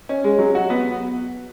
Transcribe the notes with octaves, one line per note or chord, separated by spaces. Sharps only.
C#4
G#3
F#3
F#4
B3